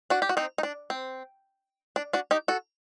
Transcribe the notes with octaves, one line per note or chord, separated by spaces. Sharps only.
D4 F#4
G4
F#4
C4 D#4
D#4
D4
C4
D4
D4 F#4
D#4 G4
F#4 A4